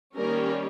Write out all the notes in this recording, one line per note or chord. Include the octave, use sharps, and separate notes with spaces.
D#3 G3 A#3 C#4 A#4